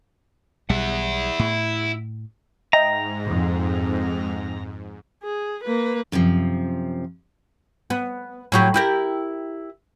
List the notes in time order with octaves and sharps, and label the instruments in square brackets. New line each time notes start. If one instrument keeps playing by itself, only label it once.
[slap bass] B1 G3 [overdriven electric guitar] E4 F#5
[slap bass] A2
[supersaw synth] G#2 [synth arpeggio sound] D#5 E5 G5 [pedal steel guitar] A#5
[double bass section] F2
[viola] G#4
A#3 B4
[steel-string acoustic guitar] F#2 C3 E3 F3
[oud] B3
A2 F#3 G4
E4 G4 A#4